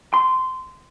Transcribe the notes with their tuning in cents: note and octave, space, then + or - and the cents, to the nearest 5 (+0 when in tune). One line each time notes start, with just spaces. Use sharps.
C6 -15